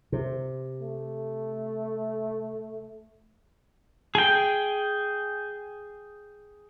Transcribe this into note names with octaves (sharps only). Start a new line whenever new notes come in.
C3
A3
G#4 G5